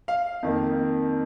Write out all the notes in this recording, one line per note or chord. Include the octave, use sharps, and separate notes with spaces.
F5
F2 D#3 A#3